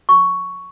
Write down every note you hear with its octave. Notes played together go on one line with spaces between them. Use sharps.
C#6